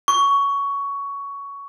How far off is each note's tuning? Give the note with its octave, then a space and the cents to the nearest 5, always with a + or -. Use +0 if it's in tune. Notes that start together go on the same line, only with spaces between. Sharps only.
C#6 +15